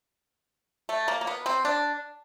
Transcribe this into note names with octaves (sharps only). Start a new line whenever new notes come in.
A3
A#3
A#3
B3
C4
D4